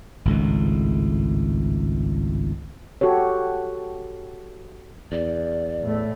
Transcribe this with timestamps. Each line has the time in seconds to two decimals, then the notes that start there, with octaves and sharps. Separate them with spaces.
0.25 G#1 C#2 A2
3.01 F#4 G4 A4 C#5
5.12 E2 D5
5.83 A2 A3